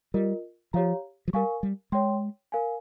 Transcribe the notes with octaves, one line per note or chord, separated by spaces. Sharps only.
G3 F4 A#4 D#5
F3 G4 C#5 F5 A#5
F3
G3 A#4 F5 G#5 C#6
G3
G#3 C#5 G5 C6
A#4 F5 G#5